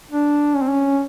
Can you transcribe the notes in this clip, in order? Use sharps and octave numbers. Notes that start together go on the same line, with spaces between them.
D4
C#4
C4
C#4